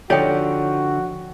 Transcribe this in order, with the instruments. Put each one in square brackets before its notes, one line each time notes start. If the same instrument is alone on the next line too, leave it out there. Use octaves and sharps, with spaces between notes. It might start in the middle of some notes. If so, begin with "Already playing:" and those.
[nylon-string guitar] D3 D5 [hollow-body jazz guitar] F3 D#4 G4 [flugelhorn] F#4 [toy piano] C#5 G5